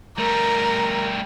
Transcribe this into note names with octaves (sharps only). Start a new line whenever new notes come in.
G3 A3 A#4